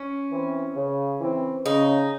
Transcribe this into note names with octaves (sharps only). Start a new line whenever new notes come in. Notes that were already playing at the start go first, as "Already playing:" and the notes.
Already playing: C#4
E3 C4
C#3
E3 C4
C#3 D#4